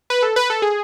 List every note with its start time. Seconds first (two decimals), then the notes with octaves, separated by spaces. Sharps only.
0.10 B4
0.22 A4
0.36 B4
0.50 A4
0.62 G#4